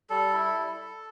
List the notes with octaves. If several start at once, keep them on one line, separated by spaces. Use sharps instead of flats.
G3 A4
E4
G3